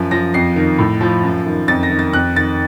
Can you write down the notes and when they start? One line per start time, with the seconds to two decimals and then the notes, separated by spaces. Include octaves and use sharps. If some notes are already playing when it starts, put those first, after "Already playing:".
Already playing: F#2 F3
0.11 F3 A#6
0.34 F2 C7
0.56 D#3
0.79 A2
1.01 F3
1.24 F#2
1.46 D#3
1.68 F2 A6
1.83 A#6
1.90 D#3
1.99 A6
2.13 F2 F#6
2.36 D#3 A6